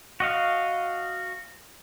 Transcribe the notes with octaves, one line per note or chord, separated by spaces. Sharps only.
F#4 D#5 F5